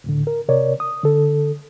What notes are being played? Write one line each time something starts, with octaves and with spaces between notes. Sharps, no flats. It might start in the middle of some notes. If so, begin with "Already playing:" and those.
C#2 A2 D3
A#4
C3 A#4 C#5 D5
D#6
D3 A4